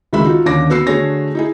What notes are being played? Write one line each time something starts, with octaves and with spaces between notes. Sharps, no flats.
C#2 D#3 G#3 E5 B5 E6
D#4 F4 F#4
D#2 D3 C#4 D6 A#6
B3 F#4 E6 C7
D3 A3 F#4 G#4 C#5 A#6
D#4 E4 G#4